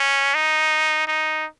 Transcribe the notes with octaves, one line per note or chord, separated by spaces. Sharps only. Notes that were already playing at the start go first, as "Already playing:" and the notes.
Already playing: C#4
D#4
D#4